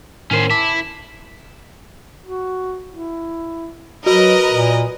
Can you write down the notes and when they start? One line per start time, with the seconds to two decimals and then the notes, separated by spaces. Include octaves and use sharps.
0.31 A2 D#3 C#4 A#4 C5
0.50 E4 A5 D6
2.26 F#4
2.91 E4
4.06 F#3 F#4 A#4 B4 D#5
4.52 A#2